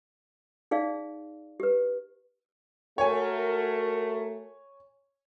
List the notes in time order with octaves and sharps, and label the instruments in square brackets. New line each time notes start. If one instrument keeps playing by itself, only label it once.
[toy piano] D#4 G#4 D5 F5
G4 B4
[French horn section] A3 F#4 A#4 [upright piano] C#5 G#5